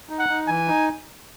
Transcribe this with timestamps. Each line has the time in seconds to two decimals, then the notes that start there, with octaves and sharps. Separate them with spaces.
0.10 D#4
0.19 F#5
0.29 D#4
0.48 E3 G#5
0.68 D#4